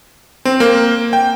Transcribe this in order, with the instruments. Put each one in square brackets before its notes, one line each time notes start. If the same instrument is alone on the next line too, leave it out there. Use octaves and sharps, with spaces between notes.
[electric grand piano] C4
A#3
G5